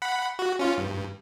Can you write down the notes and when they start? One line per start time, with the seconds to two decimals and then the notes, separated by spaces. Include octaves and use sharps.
0.02 F#5 B5
0.39 F#4
0.59 C#4 F4
0.77 G2